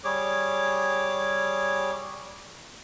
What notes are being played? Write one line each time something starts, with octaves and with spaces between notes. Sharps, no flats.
G3 G#4 C#5 D6